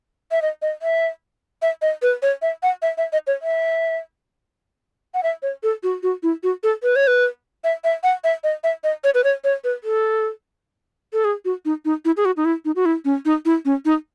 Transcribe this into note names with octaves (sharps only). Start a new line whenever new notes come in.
E5
D#5
D#5
E5
E5
D#5
B4
C#5
E5
F#5
E5
E5
D#5
C#5
E5
F#5
E5
C#5
A4
F#4
F#4
E4
F#4
A4
B4
C#5
B4
E5
E5
F#5
E5
D#5
E5
D#5
C#5
B4
C#5
C#5
B4
A4
A4
G#4
F#4
D#4
D#4
E4
G#4
F#4
D#4
E4
D#4
F#4
E4
C#4
D#4
E4
C#4
D#4